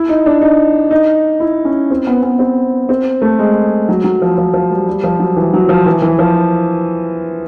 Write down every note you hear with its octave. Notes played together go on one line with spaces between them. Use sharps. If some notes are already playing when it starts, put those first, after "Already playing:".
Already playing: E4
D#4
D4
D#4
D#4
E4
C#4
C4
B3
B3
C4
C4
A3
G#3
F#3
F#3
F3
F3
F3
G3
G3
F3
F#3
E3
F#3
F3
E3
E3
F3